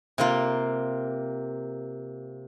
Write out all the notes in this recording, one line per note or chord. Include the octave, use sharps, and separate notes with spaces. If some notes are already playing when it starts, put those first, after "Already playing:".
C3 A#3 F4